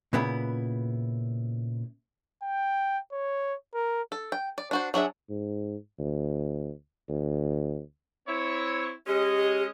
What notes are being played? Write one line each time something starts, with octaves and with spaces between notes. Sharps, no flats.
A#2 C#3 B3 E4
G5
C#5
A#4
A4
G5
D5
D4 F#4 C5
F#3 D4 G#4 E5
G#2
D2
D2
C4 E4 C#5
G#3 C#4 G4 D#5